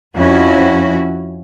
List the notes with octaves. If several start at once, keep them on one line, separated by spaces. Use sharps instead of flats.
F2 C#4 E4 F#4